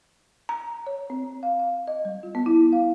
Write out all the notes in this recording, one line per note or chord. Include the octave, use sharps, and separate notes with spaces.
A#5
C#5
C4
F5
F5
D#5
G3
F4
B3
E4
F5